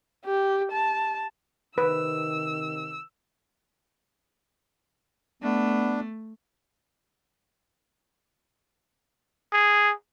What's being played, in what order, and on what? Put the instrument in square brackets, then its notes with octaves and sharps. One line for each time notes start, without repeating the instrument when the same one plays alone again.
[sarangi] G4
A5
[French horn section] C3 D#3 [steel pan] B4 [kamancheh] E6
[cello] A3 [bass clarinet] B3 [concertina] D4
[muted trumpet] G#4